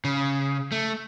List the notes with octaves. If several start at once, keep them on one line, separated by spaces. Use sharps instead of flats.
C#3
A3